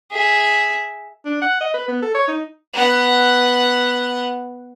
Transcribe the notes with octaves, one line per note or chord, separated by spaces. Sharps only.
G#4 E5
D4
F#5
D#5
B4
B3
A4
C#5
D#4
B3 F#5